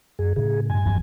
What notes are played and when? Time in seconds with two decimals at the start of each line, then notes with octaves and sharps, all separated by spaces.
0.19 F#2 G#4
0.36 A2 C#3 G#4
0.70 G2 G#5
0.84 D#1 E2 F3